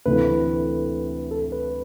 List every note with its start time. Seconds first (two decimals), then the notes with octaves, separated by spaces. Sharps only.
0.06 D2 C3 E3 A3 B4
1.31 A4
1.52 B4